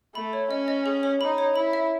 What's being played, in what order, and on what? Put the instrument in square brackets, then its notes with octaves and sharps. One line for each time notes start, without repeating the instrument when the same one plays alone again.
[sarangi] A3 [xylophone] B5
[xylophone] C#5
[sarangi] C#4 [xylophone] D#5
[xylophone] D#5
G#4
C#5
[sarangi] D#4 [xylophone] B5
[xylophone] C#5
[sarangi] E4 [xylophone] B5
[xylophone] E5